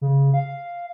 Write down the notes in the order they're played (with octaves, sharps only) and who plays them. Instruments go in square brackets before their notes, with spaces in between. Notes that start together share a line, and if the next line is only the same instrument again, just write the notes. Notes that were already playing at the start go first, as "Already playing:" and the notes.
[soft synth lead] C#3
F5